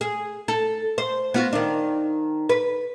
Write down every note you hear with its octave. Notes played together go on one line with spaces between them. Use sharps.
G#4
A4
C5
B3 F4 F#4
D#3 D4
B4